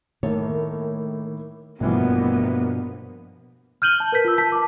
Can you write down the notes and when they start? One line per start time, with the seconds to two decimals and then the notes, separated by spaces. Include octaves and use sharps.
0.23 A2 D#3 A#3 A4 C#5
1.80 A1 G2 B2 E3 F3 A#3 B3
3.82 F6 G6 D#7 F#7 G7
4.00 A5
4.12 A#4 B4 G6 B6
4.25 F4 E6
4.38 A5 B6
4.52 A5 D6